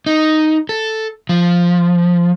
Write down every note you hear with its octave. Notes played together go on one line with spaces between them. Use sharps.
D#4
A4
F3